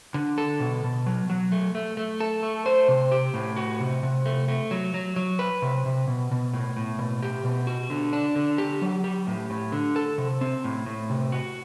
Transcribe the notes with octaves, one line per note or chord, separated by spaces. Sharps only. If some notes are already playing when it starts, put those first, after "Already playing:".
D3
A4
B2
B2
F#3
F#3
A3
A3
A3
A4
A3
C5
C3
G4
A2
F#4
C3
C3
A3
A3
F#3
F#3
F#3
B4
C3
C3
B2
B2
A2
A2
B2
G4
B2
F#4
D3
D4
D3
G4
F#3
G4
A2
A2
D3
A4
C3
C4
A2
A2
C3
F#4